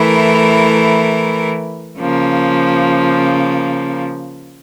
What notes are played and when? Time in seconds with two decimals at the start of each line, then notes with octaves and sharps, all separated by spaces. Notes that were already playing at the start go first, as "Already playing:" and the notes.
Already playing: E3 A3 E4 A#4
1.99 C#3 F3 A#3